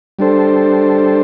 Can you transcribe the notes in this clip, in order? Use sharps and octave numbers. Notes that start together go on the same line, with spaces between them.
G3 D4 A4 C5